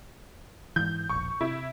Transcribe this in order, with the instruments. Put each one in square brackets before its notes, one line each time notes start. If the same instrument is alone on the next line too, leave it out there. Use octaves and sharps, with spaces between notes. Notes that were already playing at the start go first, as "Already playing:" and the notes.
[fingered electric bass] G#2 E3 [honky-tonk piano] G6
[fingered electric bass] E1 A#1 [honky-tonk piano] C#6
[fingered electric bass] C3 [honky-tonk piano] E4